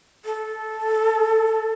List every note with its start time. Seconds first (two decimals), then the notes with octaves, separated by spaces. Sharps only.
0.25 A4